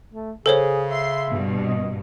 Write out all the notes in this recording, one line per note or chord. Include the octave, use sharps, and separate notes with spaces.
A3
C#3 G#4 A4 C5 C#5
E5 C6
G2 B2
D#5